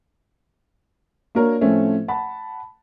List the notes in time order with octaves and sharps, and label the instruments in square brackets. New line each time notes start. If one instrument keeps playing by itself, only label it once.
[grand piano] A#3 D4 F#4 A#4 C#5
A2 F3 A3 C4 C#4
F#5 A5 B5